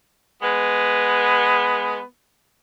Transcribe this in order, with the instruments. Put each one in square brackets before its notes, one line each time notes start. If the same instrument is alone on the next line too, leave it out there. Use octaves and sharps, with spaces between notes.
[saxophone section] G#3 B3